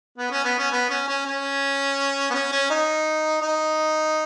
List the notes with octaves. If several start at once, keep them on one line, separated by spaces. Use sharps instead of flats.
B3
C#4
B3
C#4
B3
C#4
C#4
C#4
B3
C#4
C#4
D#4
D#4